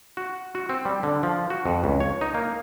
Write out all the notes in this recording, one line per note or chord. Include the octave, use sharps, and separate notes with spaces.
F#4
F#4
C4
G3
D3
F3
F#4
F2
C#2
C#5
D#4
A#3